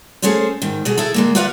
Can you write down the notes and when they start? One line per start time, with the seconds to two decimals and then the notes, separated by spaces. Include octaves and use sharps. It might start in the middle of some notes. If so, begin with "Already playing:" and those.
0.22 A3 C#4 G#4 A4 C5
0.62 G#2 D#3
0.85 B2 D3 G#4
0.98 E4 G#4 A4
1.14 D3 G#3 A#3
1.35 F4 F#4 B4 D5 E5 F5